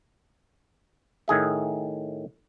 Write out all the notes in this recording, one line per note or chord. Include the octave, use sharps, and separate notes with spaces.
A2 D#3 G#4 E5